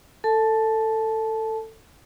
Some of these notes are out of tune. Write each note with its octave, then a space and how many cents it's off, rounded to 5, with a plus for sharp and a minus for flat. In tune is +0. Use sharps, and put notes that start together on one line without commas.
A4 +20 A5 -20